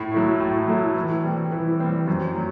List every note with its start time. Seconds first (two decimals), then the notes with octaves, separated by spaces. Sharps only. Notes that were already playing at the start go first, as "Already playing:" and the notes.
Already playing: A2
0.12 F#3 A3 E4
0.40 A2
0.68 F#3 A3 E4
0.96 E3
1.23 G3 C4
1.52 E3
1.80 G3 C4
2.07 F#2
2.36 F#3